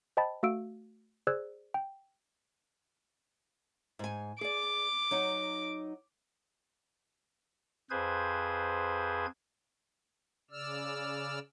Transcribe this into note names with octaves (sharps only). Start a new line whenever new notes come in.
C5 D#5 G5 A5 B5 A6
A3 F#4 F5 E6 D7
G#4 C5 D5 E6 F#6 G#6
G5
G#2 G#5
G#4 D5 D6
F#3 D#4 F#5
F2 G#4 B4 C5 G#6
C#3 D5 E6 F6